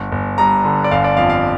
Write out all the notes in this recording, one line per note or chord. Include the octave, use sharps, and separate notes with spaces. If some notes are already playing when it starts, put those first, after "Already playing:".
Already playing: G1
G1
G2 A#5
D3
D5
G1 F5
D5
F2 F5
F5